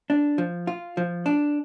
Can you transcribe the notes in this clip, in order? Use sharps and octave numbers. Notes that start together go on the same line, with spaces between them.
D4
F3
F4
F3
D4